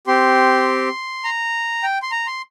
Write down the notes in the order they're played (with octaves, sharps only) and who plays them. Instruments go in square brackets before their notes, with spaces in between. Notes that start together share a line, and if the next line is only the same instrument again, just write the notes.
[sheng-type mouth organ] C4 G4 C6
A#5
G5
C6
A#5
C6